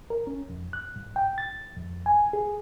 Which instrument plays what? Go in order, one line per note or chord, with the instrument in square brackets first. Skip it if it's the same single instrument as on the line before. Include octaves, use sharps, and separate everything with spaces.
[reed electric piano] A#4
C#4
F2
F#6
G2
G5
A6
F2
G#5
G#4